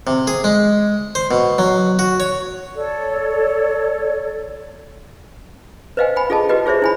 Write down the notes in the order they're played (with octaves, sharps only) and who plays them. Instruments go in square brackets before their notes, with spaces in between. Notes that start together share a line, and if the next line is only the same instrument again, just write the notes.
[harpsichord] C3
G#4
G#3
C5
B2
F#3
F#4
C#5
[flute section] A4 C#5 D5
[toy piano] B4 C5 D#5 F5 G5 G#5
G5 G#5 B5
F4 G#4 A4 D#5 A5
F#4 G4 B4 D#5 G5
F4 G#4 C5 C#5 E5
E4 G#5 B5